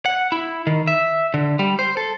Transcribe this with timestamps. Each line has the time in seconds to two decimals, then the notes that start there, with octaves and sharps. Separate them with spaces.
0.06 F#5
0.32 E4
0.67 D#3
0.87 E5
1.34 D3
1.59 G3
1.79 C5
1.97 A4